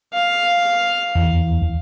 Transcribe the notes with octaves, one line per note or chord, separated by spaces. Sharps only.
F5
E2